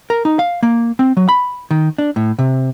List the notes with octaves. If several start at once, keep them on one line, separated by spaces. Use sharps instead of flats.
A#4
D#4
F5
A#3
C4
F#3
B5
D#3
D4
A2
C3